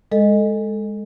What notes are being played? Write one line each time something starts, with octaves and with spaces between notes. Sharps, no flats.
G#3 A4 D#5